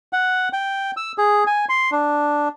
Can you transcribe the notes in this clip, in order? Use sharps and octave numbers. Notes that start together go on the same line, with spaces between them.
F#5
G5
E6
G#4
G#5
C6
D4